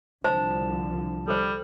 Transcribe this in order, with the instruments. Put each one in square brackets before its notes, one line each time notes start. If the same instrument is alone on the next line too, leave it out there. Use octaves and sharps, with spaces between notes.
[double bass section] C2 D3 F3 [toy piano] C5 [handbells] A5
[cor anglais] G3 [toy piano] A4 C5